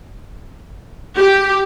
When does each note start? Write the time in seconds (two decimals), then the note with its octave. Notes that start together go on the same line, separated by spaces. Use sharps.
1.17 G4